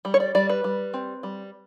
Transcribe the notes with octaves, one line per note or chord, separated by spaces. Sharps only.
G3
C#5
D5
G3 D5
B4
G3
C4
G3